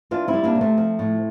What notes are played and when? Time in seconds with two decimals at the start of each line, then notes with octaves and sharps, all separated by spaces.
0.11 E3 D4 F4
0.28 C4 E4
0.33 G3
0.44 A#3 D4
0.55 C3
0.61 A3 C4
0.77 F3
0.99 A2